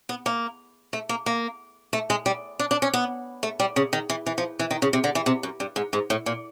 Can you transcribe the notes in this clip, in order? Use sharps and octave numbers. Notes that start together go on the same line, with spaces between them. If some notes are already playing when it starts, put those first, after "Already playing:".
B3
A#3
A3
A#3
A#3
A3
G#3
G3
D4
D4
C#4
B3
A3
G3
C#3
D#3
E3
E3
F3
E3
D#3
C#3
C3
D3
E3
C3
F#2
G2
G#2
G#2
A2
A#2